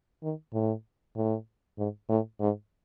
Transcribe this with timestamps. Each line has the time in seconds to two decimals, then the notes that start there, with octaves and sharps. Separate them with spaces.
0.23 D#3
0.53 A2
1.16 A2
1.78 G#2
2.09 A2
2.40 G#2